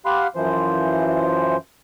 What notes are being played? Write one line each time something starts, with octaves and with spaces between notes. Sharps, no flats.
G4 F5 F#5 B5 C6
F#2 E3 F3 C5